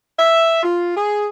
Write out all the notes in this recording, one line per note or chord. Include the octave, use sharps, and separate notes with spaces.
E5
F4
G#4